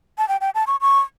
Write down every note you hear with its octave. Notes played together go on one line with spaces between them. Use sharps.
A5
G5
G5
A5
C#6
C#6